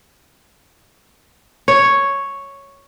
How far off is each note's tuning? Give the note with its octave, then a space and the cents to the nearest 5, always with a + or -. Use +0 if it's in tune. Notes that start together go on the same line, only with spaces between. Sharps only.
C#5 +0